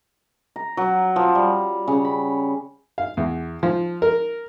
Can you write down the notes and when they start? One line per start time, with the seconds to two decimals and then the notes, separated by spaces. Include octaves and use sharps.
0.56 A#5
0.77 F#3
1.16 F3
1.35 G3
1.88 C#3
2.05 B5
2.98 F5
3.17 E2
3.63 F3
4.02 A#4